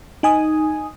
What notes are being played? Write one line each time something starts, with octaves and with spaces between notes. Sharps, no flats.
D#4 G#5 D#6